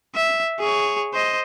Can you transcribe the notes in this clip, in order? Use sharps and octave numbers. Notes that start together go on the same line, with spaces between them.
E5
G#4 C#5
C5 D#5